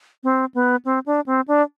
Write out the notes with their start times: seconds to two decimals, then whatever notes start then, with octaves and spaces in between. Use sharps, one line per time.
0.24 C4
0.55 B3
0.85 C4
1.06 D4
1.26 C4
1.48 D4